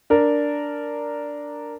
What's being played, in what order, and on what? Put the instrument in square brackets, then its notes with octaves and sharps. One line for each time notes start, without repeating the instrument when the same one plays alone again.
[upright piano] D4 A#4